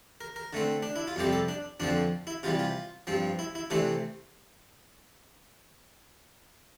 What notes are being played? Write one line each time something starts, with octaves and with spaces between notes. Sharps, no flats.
A#4
A#4
D3 A3 C4
D4
E4
F4
F2 C3 G3 C4 G4
A4
D4
F2 D3 F3 C4 D4
E4
C3 E3 G3 F4
F4
G2 F3 C4
E4
E4
C3 E3 A3 C4 D4